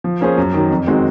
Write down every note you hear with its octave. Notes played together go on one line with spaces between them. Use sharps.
F3
A#3 C#4 G#4 C5
F#2
D#3 F#3
F2
D#3 G#3 C4 F#4